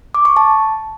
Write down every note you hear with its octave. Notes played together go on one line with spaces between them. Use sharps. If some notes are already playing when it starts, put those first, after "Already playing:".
D6
C#6
A5